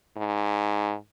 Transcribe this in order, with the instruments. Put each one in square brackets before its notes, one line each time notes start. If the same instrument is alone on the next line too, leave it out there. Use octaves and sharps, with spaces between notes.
[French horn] G#2